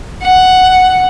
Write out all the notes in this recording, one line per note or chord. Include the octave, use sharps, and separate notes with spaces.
F#5